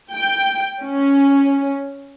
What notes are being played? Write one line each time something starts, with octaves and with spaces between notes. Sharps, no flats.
G5
C#4